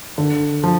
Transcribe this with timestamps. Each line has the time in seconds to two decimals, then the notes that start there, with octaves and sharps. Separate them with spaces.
0.18 D3
0.64 F3